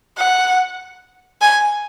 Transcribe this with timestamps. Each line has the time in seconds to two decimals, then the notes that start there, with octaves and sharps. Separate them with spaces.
0.17 F#5
1.41 G#5